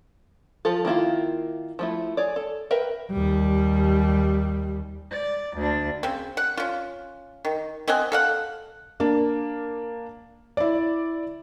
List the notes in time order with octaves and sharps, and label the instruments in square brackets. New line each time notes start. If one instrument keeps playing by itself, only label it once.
[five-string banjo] F3 F4 A4
D#3 A#3 E4 F4
F3 A3 E4
G#4 C#5 D5
A4
A#4 B4 E5 G5
[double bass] D#2 G3
[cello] D5
D2 D4
[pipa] C#3 C4
F#5
C#4 F4
D#3
C4 D#5 F#5 G#5
A4 F5 F#5
[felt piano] A#3 D4
E4 D5